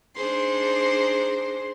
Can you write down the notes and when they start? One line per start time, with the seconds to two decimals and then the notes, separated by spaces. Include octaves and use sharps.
0.16 D4 D#4 G#4 C5 C6